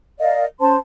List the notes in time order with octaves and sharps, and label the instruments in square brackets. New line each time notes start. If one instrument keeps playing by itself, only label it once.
[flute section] A#4 D5 D#5 F5
C#4 C5 A5 C6